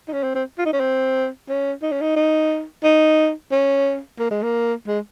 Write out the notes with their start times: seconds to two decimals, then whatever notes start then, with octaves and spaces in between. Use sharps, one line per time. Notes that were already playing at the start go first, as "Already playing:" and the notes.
0.08 D#4
0.13 C#4
0.24 C4
0.35 C4
0.58 F4
0.66 D#4
0.73 C#4
0.80 C4
1.49 C#4
1.83 D#4
1.92 C#4
2.01 D#4
2.16 D#4
2.84 D#4
3.51 C#4
4.19 A#3
4.31 G#3
4.43 A#3
4.87 G#3